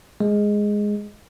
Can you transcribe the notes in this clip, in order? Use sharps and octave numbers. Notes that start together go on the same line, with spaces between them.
G#3